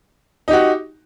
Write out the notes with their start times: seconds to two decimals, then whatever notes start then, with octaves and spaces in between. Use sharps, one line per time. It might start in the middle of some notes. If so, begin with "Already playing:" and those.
0.48 D#4
0.50 G4
0.53 F#4